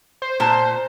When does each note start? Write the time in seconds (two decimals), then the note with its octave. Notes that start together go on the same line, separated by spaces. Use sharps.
0.22 C5
0.40 A#2 C5 A5